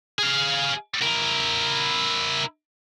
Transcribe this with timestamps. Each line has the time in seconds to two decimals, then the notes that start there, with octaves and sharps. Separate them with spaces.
0.19 G#4 F5
1.02 E4 A#4